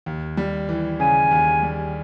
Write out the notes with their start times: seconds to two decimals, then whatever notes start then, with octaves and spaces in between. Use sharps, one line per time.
0.06 D#2
0.37 G3
0.69 E3
1.00 C#3 G#5
1.31 D#2
1.62 G3